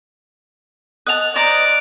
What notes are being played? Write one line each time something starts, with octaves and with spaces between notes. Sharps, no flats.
D#5 F#5 A5 F#6 F7
C5 D5 D#5 A#5